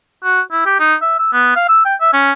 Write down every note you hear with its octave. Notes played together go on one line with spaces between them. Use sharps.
F#4
E4
G4
D#4
E5
E6
B3
F5
E6
G5
E5
C#4